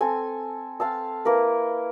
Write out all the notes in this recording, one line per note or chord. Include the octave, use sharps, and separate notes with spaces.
C4 A4 G#5
C4 F5 A5 E6
A#3 E4 A#4 B4